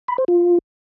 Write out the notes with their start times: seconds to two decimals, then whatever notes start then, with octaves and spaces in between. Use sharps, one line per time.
0.08 B5
0.18 C5
0.28 F4